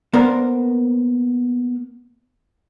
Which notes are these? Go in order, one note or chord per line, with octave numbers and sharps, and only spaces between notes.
A#3 B3 D4 A#4 C5